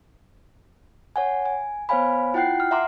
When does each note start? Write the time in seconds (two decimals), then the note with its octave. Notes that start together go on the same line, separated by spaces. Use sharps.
1.16 C#5 F#5 G#5
1.46 G#5
1.89 B3 C5 C#5 F5 G#5 B5
2.34 E4 F4 F#5 G5 F#6 C7
2.60 F6
2.71 E5 F#5 A#5 C6 D6